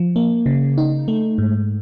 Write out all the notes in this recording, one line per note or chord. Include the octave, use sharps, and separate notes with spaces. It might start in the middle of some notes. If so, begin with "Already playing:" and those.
Already playing: F3
A#3
C#3
D#4
A3
G#2